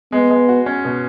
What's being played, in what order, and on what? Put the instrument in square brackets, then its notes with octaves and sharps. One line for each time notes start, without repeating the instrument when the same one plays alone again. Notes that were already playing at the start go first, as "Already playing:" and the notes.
[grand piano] G#3 [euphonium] B3
[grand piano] G#3
F#4
C#4
B2